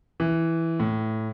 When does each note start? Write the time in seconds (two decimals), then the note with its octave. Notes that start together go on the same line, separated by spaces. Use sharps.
0.20 E3
0.80 A2